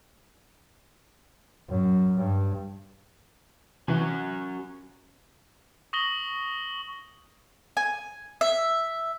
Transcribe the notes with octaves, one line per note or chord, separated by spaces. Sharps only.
F#2
G2
C3 E3 C#4 F#4 G#5
C#6 D#6 A#6 F#7 G7
G#5
E5